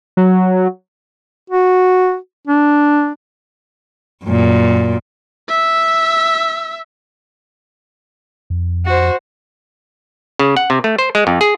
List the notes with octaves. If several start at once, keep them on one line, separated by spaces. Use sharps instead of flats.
F#3
F#4
D4
F#2 A#2
E5 E6
F2
F#4 C5
C#3
F#5
C3
A3
C5
G#3
F2
G#4